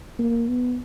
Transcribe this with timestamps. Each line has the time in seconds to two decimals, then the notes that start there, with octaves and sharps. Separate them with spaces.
0.19 A#3
0.48 B3